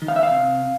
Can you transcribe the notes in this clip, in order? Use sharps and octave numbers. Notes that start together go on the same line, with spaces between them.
D#3
F5
E5
F5
C3